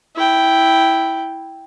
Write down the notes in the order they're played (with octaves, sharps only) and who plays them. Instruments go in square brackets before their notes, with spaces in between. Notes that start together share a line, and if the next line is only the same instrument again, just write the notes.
[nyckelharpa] E4 G5